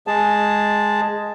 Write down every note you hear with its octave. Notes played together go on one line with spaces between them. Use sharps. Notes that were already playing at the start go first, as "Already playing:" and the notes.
G#3 G#4 A5